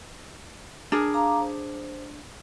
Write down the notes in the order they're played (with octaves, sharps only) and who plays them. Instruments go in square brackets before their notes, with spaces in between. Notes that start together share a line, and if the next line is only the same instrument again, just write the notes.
[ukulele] D4 G#4 A#4
[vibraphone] F5 A#5 D6
C5